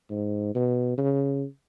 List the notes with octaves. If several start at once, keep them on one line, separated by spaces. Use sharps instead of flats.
G#2
B2
C#3